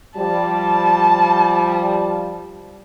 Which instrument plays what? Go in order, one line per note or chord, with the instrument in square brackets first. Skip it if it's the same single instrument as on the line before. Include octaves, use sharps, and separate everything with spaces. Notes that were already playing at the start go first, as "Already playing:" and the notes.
[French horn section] F3 G3 [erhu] A5